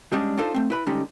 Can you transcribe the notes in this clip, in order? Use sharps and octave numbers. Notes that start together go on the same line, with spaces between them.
G#2 G3 G#3 C#4 D4
D4 D#4 F4 A4 C5
A3 C4
E4 B4 B5
D3 G3 G#3 C#4 D#4